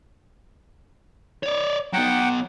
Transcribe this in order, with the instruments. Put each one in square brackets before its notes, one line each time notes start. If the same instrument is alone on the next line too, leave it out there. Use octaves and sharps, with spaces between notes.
[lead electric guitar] C#5 D5
[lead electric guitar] F#3 B3 [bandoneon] F#5 G5